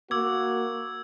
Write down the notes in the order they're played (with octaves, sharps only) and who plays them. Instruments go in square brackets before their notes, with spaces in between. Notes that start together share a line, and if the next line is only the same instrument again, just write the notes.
[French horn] A#3 [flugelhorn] F#4 [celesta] D6 [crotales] E6 G#6